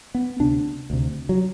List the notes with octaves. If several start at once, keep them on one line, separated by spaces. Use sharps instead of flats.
B3
D2 C3 D4
D2 C3
F#3